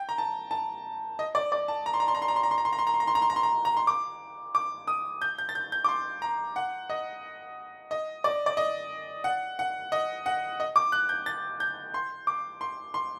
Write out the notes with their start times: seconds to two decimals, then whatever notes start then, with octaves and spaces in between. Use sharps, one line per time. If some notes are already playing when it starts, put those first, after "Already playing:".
Already playing: G5
0.09 A#5
0.18 A5
0.51 A5
1.19 D#5
1.35 D5
1.52 D5
1.68 A5
1.86 A#5
1.94 C6
2.00 A#5
2.08 C6
2.14 A#5
2.22 C6
2.28 A#5
2.36 C6
2.43 A#5
2.51 C6
2.58 A#5
2.65 C6
2.73 A#5
2.79 C6
2.87 A#5
2.94 C6
3.00 A#5
3.07 C6
3.15 A#5
3.22 C6
3.30 A#5
3.36 C6
3.43 A#5
3.65 A#5
3.77 C6
3.87 D6
4.55 D6
4.87 D#6
5.22 G6
5.38 G6
5.49 A6
5.55 G6
5.72 G6
5.84 D6
5.88 C6
6.22 A#5
6.56 F#5
6.90 D#5
7.91 D#5
8.24 D5
8.46 D5
8.57 D#5
9.24 F#5
9.59 F#5
9.92 D#5
10.26 F#5
10.60 D#5
10.76 D6
10.92 F#6
11.09 G6
11.26 A6
11.60 G6
11.94 C6
12.27 D6
12.61 C6
12.94 C6